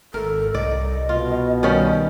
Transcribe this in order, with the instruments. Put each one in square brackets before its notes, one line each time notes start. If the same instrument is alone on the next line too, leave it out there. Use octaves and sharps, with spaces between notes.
[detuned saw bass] G#1 [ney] A4 [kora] A#4
[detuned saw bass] C2 [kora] D5 [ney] D#5
[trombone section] B2 [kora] F4
[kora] D#3 G3 C#4